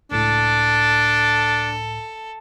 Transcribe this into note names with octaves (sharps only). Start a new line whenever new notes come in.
C#2 A2 D4 A4